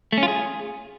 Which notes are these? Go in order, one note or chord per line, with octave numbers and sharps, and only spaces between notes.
A3
C#4
F4
G#4